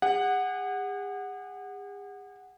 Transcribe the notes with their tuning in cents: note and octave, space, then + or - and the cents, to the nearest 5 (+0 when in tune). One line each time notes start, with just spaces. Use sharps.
G#4 -45 F#5 +0